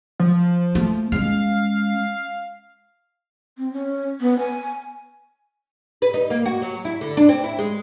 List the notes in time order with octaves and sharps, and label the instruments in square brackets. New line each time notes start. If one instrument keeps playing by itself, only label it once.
[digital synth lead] F3
[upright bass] A3
[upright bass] G#3 C#4 [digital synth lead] F5
[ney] C4
C#4
B3
G#5
[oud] B4
D#4
A#3
F#4
F#3
E4
D3
D4
C4
E4
G#3